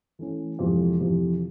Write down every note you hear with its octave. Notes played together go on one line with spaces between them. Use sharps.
E3 A3 C#4
F2 C3 E3 G#3
F2 C3 E3